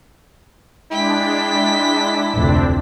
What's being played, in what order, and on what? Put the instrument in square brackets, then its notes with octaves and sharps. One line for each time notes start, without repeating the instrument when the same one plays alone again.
[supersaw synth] G#3 D4 [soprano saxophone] E4 [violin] G5 B6
[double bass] F1 D2 [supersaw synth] C4 D4